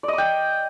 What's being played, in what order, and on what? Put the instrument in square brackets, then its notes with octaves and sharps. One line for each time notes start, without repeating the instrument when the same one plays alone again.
[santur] D5
D#5
D6
G5